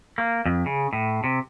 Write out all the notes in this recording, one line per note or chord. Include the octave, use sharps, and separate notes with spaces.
A#3
F2
C#3
A2
C3